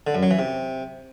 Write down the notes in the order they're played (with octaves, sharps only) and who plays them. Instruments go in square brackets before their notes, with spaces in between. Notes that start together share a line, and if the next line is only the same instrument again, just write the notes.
[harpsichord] D3
F#2
F#3
E3
C3